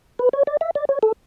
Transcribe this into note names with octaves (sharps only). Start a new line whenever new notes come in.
B4
C#5
D5
E5
D5
C#5
A4